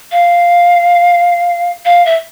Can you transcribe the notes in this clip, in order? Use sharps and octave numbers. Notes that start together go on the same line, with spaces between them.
F5
F5
E5